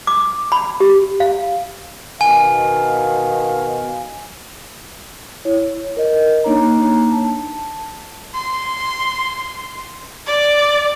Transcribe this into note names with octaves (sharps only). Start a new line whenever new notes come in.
D6
B5
G4
F5
B2 D#3 F5 G#5
E4 C#5
A#4 D#5
A#3 D4 D#4 C#5 A#5
A5
C6
D5